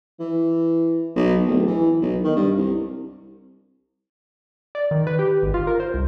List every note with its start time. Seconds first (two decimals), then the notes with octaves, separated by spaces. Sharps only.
0.20 E3
1.16 B1
1.46 D1
1.67 E3
2.01 B1
2.24 D#3
2.36 G2
2.56 C2
4.75 D5
4.91 D#3
5.07 B4
5.19 G4
5.42 G#1
5.54 F4
5.67 A#4
5.80 C5
5.94 C2